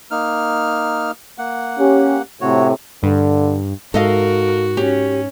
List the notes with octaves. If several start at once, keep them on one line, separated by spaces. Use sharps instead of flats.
A#3 D#4 F6
A#3 F#5
C#4 G4
A2 C3 F#4 C#5
G2 D3
G#2 F#4 A4 A#4 D#5 F5
C#4 G4